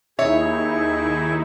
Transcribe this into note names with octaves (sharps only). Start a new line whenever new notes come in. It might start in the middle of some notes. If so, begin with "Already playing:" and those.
D#2 D#4 E4 G#4 C#5 E5 C#6